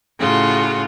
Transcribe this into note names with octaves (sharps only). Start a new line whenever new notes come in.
A2 C#3 F4 F#4